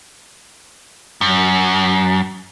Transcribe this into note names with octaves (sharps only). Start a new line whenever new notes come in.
F#2